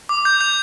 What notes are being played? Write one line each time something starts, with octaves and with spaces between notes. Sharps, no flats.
D6
G6
G6